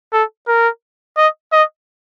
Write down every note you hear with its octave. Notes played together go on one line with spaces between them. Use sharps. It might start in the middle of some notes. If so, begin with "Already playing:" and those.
A4
A#4
D#5
D#5